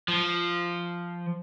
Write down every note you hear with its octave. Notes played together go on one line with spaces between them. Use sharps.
F3